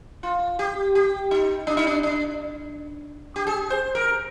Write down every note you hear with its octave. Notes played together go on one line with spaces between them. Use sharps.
F4
G4
G4
D#4
D4
D#4
D4
D4
G4
G#4
C5
A#4